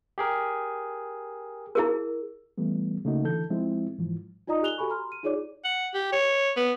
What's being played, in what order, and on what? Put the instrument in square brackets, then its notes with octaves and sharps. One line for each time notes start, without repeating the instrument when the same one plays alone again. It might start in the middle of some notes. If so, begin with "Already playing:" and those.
[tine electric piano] G4 G#4 A#4
[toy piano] E4 G#4 A#4
[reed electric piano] E3 G3 A3 B3
C#3 A3 A#3 D#4 F#4
D3 E3 A4 G6
F3 G#3 C4 E4
G#2 E3 F3
[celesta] D#4 F4 D5 D#5 A#5 D#6
G4 A4 G#5 F#6 F7 G7
F#4 G4 A4 G#5 B5 C#6
A#5 C6 F6
D#7
D#4 F4 G#4 C#5 D5 D6
[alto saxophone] F#5
G4
C#5
B3